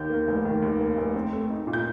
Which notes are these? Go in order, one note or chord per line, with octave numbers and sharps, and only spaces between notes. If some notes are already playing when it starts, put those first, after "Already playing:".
Already playing: D#2 D#3 G6
A#3
F1
D#3
D#2
A#3
F1
C4
A3
D#4
A#2
G6